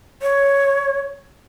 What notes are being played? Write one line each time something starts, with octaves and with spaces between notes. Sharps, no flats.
C#5